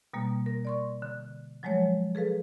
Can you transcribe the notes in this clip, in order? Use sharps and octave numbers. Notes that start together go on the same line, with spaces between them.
B2 G3 A#3
A#4
D5 C6 C#6
D3
F3 F#3 G#3 A3 C#5
G#4 A4 B4 F5